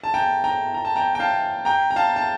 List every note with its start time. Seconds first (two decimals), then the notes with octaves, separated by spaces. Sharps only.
0.04 A5
0.14 G5 A#5
0.44 G5 A#5
0.74 A#5
0.85 A5
0.96 G5 A#5
1.15 G5
1.20 F5 A5
1.65 G5 A#5
1.90 A#5
1.96 F5 A5
2.16 A5